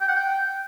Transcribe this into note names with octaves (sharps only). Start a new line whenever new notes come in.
G5
F#5
G5